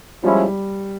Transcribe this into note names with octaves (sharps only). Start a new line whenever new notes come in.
F3 G3 G#3 C#4 E4